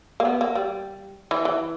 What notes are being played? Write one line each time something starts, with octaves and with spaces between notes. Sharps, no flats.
A#3
B3
A#3
G3
E3
E3